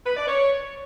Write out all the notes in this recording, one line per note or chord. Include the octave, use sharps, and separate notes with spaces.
B4
D5
C#5